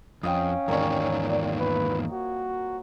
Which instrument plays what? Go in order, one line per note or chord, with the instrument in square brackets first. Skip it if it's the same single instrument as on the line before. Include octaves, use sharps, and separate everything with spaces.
[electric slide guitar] F2 [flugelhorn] C#4 [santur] D#5 F5 G5
[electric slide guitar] E2 G#2 D#3 [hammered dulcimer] G3 G#3 C4 [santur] A#4 C#5
[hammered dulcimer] A#2
[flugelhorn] B4
F#4